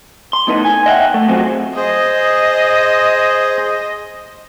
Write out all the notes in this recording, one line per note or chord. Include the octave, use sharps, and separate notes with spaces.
C6
A2 B3 D#4 A4 B4 D#5
G#5
D#5 E5 F#5 G5
A3
F#3 C4 F4 F#4 G#4 C5
G#4 C5 D#5